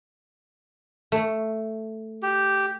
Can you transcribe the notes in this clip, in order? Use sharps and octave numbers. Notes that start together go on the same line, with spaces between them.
A3
G4